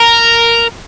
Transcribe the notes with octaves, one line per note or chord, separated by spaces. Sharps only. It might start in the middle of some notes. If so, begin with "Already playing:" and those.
Already playing: A#4